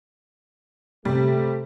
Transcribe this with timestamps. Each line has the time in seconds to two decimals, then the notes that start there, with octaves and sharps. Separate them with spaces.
1.05 C3 G3 A3 G4